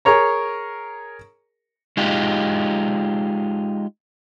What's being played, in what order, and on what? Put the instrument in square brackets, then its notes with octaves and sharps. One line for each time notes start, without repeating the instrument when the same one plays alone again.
[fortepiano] G#4 A#4 C#5 A#5
[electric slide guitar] G#3 D#4 F4 G4